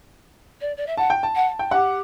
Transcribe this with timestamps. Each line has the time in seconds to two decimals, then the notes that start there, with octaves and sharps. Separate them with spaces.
0.60 D5
0.77 D5
0.86 E5
0.97 F#5 A5
1.10 G5
1.23 A5
1.35 F#5
1.59 G5
1.71 G4 F#5